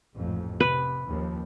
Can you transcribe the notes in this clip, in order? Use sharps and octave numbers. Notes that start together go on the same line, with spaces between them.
A1 F2 G#2
C3 B4
D#2 C#3 F3